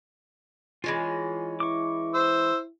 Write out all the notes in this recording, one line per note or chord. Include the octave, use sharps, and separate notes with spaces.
E3 G#3 C#4 F4
E4 C#6 D6
C5 E6